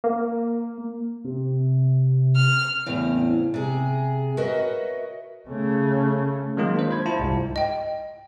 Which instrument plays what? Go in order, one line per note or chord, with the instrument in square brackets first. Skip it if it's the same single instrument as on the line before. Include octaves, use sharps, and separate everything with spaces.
[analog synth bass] A#3
[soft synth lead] C3
[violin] F6
[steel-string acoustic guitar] E2 A2 C#3 C4
C3 G#4
F#4 A#4 B4 C#5 D#5 E5
[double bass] C#3 A3
[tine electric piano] D#3 F#3 G#3 A#3 F4
D4 C5
C5 B5 G#6
E4 F4 A5
C2 G#2
[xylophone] D#5 G5